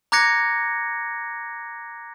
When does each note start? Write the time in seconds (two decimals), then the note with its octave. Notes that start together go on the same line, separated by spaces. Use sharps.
0.12 A#5 D6 F#6 G#6 A#6 C#7